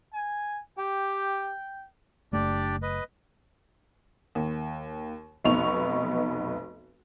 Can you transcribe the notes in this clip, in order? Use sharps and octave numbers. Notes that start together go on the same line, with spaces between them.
G#5
G4 G5
F#1 A3 D4 G4 D5
B4 D#5
D#2
F1 B1 B3 D#4 C#6 F7